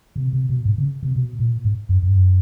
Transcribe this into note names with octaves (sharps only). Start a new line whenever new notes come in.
C3
C3
B2
G#2
C#3
C3
B2
A#2
G#2
F#2
F#2
G2
F#2